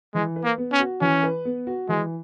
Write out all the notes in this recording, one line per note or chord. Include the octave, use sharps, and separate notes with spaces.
E3 G#3
B4
A#3
B3
C#4
F#4
E3 C#4
B4
B3
F#4
E3 G#3